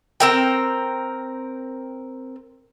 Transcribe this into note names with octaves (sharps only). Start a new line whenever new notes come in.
C4 A#4 G5